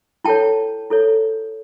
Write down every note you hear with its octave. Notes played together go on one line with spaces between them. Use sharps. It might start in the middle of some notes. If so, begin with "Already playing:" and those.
E4 A4 C#5 G5 A5
E4 A4 C#5